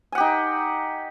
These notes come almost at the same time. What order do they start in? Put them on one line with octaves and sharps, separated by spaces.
G#5 F#5 G4 D#4